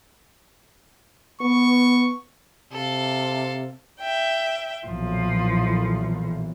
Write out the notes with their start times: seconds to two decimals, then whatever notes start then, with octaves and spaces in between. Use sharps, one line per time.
1.41 B3 C#6
2.72 C3 A4 F5
4.01 E5 G5
4.86 B1 A#2 E3 F3